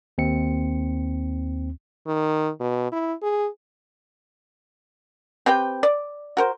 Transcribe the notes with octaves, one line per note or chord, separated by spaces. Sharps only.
D#2 C4 C#7
D#3
B2
E4
G#4
C4 G4 B4 G5
D5
F#4 A#4 C5